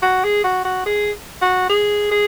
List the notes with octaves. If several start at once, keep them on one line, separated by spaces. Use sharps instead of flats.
F#4
G#4
F#4
F#4
G#4
F#4
G#4
G#4